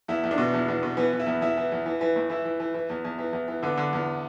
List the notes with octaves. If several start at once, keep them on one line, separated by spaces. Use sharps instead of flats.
E2 E4
E2
D4
B2
E2
E2
B2
E3 B3
E3
E4
E2
E2 E4
E3
E2
E3
E3
A2
E3 E4
E3
E3
E3
E2
E2
E3
E2
E3
D3 B3
D3
E2